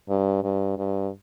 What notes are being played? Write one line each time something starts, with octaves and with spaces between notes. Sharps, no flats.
G2
G2
G2